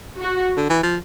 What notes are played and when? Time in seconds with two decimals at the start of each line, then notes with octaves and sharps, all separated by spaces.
0.18 F#4
0.57 D3
0.70 E3
0.83 F3